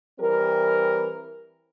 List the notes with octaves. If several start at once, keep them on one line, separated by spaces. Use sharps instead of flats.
E3 G3 C4 A#4